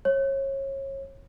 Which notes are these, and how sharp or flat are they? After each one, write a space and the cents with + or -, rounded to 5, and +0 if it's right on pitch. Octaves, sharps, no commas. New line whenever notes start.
C#5 -30